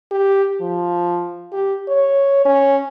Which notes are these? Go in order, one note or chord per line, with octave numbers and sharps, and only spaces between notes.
G4
F3
G4
C#5
C#4